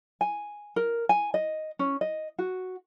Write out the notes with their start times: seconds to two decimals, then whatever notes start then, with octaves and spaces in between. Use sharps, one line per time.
0.21 G#5
0.76 A#4
1.09 G#5
1.34 D#5
1.79 C#4
2.01 D#5
2.38 F#4